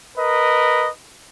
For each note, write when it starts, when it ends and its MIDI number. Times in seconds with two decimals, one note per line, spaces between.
0.17 0.89 70
0.17 0.89 71
0.17 0.89 75